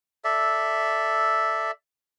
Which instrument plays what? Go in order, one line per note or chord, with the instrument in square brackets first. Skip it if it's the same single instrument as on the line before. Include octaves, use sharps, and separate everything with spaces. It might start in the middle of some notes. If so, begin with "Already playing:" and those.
[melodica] A4 D5 E5